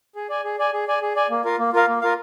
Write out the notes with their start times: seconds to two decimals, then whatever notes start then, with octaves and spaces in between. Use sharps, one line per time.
0.15 G#4
0.30 D5 G#5
0.44 G#4
0.59 D5 G#5
0.73 G#4
0.88 D5 G#5
1.02 G#4
1.16 D5 G#5
1.30 A#3
1.45 F4 A#4 F5
1.59 A#3
1.73 F4 A#4 F5
1.87 A#3
2.02 F4 A#4 F5